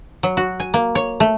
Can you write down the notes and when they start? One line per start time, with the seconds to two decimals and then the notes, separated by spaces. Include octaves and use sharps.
0.23 F#3
0.37 F#4
0.60 G#5
0.74 A#3
0.95 C#5
1.20 A3